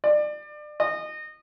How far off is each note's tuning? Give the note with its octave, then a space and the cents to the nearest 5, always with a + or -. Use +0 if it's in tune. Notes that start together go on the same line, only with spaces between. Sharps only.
D5 +30
D#5 -20